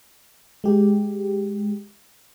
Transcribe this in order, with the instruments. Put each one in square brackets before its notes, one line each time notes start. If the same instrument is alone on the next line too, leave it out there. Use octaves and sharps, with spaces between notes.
[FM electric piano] G#3 G4